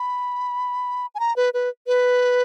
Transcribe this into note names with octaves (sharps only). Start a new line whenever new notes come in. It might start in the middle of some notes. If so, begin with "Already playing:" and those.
Already playing: B5
G#5
A#5
B4
B4
B4